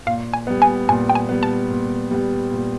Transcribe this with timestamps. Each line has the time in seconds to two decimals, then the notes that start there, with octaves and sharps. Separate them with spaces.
0.06 A#2 F5
0.34 G#5
0.47 G3 B3
0.62 G#5
0.88 A#2 G#5
1.10 G5
1.15 G#5
1.29 G3 B3
1.43 A5
1.70 A#2
2.11 G3 B3
2.52 A#2